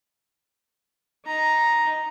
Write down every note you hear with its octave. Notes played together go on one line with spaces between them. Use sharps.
D#4 A#5